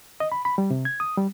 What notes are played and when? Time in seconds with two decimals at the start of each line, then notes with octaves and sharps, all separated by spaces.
0.20 D#5
0.32 B5
0.45 B5
0.58 G3
0.71 C3
0.85 G#6
1.00 D#6
1.17 G3